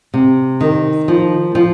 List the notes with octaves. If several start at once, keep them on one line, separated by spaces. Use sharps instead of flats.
C3
D#3
F3
F3